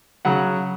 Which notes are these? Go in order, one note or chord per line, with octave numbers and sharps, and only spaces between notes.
C#3 F#3 F#5